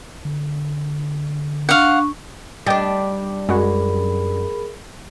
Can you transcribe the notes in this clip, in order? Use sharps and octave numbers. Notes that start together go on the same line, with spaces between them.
D3
D4 F5 F#5 C#6
G3 D4 D#5 G5 A6
F#2 G#3 F#4 G#4 A#4 B5